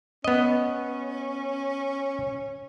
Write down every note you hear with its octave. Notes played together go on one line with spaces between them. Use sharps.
B3 C#4 D#5